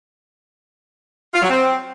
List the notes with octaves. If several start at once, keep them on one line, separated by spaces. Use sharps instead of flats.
F4
F#3
C4